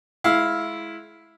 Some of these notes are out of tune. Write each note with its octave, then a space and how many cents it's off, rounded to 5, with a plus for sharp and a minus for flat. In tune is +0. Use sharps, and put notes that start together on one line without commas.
G#3 +30 E4 +0 F5 +0